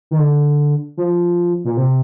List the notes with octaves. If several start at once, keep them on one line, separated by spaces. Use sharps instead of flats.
D#3
D3
F3
A#2
C3